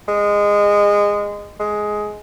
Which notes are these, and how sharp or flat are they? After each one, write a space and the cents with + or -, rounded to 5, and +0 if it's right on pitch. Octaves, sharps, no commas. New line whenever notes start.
G#3 -20
G#3 +10